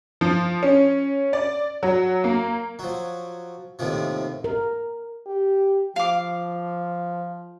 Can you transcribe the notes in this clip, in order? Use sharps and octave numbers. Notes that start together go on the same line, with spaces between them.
F3
C#4
D5
F#3
A#3
F3 F#3
D#2 A2 C3 F3
A#4
G4
F3 F5 D6